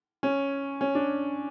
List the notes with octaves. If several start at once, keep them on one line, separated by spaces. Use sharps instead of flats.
C#4
C#4
D4